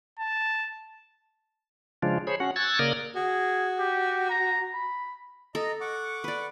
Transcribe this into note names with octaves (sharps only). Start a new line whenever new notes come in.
A5
C#3 F3 G#3 D4 F4
G#4 C5 C#5 B5
C#4 F#4 F#5
C#6 E6 F#6 G#6 A6
C#3 A#3 A#4 D5 D#6 F6
F#4 G#4
G4
A#5
B5
A4 D#5 A#5
F#5 C#6 D6
B4 D5